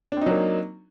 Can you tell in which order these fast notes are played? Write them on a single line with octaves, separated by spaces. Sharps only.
D4 C4 D#4 F#3 A#3